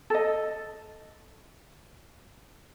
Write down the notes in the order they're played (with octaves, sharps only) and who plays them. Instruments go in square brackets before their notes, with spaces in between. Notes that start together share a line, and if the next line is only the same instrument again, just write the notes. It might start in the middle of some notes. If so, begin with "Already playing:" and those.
[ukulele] A4 D#5